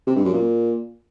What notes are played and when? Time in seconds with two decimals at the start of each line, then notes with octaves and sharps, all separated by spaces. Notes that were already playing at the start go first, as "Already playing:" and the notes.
0.07 C3
0.16 G2
0.25 F#2
0.34 A#2